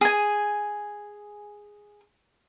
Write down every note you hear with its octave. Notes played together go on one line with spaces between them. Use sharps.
G#4 G#5